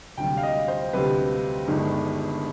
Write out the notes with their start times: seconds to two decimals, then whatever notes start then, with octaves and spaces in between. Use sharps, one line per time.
0.17 D2 C3 G3 G5
0.37 F5
0.43 D#5
0.68 C5
0.93 D2 C3 G3 B4
1.67 G1 G2 D#3 G#3